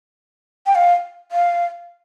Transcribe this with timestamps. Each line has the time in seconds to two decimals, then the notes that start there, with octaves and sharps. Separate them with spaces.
0.66 G5
0.75 F5
1.32 F5